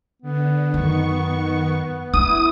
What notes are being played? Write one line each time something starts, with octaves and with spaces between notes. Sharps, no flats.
D3 B3
F#2 D#3 C#6
D4 E4 D#6